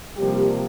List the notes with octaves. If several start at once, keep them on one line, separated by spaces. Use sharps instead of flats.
C3 F3 G3 A#3 G4